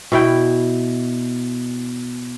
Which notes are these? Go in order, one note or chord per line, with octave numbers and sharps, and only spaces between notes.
B2 E4 G5